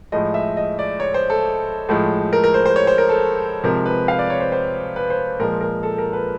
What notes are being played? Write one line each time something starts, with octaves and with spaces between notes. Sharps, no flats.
A2 F3 G#3 D#5
E5
D#5
D5
C#5
C5
A4
A2 F3 G#3
A#4
A#4
C5
C5
C#5
C5
A#4
A4
C3 F3 G#3 A#4
B4
F5
D5
C#5
C5
C5
B4
C5
A#2 F3 G#3 A#4
A#4
A4
A#4
B4